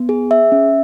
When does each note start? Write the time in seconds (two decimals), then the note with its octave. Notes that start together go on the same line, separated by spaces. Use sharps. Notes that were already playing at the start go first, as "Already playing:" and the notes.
Already playing: B3
0.09 G#4
0.31 G#4 E5
0.52 C#4